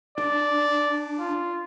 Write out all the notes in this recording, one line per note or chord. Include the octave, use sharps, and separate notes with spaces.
D4 D5
F4